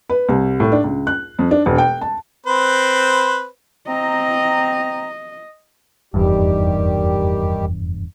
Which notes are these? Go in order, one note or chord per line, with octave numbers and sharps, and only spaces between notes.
B4
C2
A2
D4
C#2
F#6
F2
D4
E1
G5
A5
C4 B4 C5
C4 D#5 A#5
F1 E2 G2 D#3 G3 G4